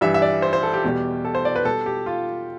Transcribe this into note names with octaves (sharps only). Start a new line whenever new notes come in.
G2 E3 G3 E5
E5
D5
C5
C5
A4
G4
E2 B2 G3
A4
C5
D5
B4
B2 G3 A4
G4
F4